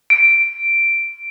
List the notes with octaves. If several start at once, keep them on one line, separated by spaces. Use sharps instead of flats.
D7